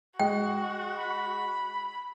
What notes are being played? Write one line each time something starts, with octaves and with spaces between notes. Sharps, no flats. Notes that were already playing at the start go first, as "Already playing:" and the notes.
G#3 F#4 G5
B5